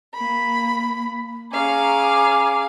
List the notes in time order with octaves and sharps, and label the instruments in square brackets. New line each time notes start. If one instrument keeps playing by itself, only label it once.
[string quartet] A#3 B5
[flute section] C#4 A#5 D6 [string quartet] G#4 F5